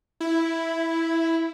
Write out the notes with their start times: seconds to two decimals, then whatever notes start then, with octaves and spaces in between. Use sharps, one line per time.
0.20 E4